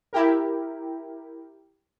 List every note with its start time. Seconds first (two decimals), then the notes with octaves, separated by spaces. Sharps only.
0.13 E4 G4 A#4